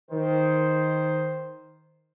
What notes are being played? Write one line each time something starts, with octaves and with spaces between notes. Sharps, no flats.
D#3 C5